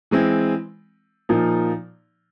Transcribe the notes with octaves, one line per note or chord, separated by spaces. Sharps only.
E3 G#3 C4 E4
A#2 F3 A#3 D#4